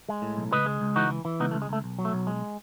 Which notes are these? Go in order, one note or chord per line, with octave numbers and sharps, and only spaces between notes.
G#3
A2
B1
C#2 B4 D#5
G#3
C#2
E3 D#4 F#4
E3
E3
C#2 B3 D#4
A3
C#2
G#3
C#2 A3
B1
F#3
A3
B1
G#3